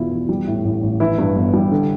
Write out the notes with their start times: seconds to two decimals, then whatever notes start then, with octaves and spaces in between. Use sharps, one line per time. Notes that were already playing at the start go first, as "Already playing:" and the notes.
Already playing: E2 B2 A3 E4 F4
0.11 E2
0.29 G3
0.47 A2
0.64 A1
0.83 A1
1.00 E3 E4
1.18 G2
1.35 G1
1.53 G3
1.71 D3